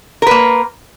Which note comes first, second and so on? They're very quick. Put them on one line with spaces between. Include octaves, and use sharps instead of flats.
A#4 B4 A#3